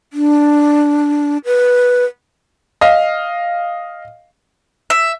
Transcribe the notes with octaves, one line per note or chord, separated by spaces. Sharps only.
D4
B4
D#5 F5
E5